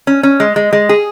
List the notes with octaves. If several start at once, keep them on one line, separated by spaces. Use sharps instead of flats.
C#4
C#4
G#3
G#3
G#3
G#4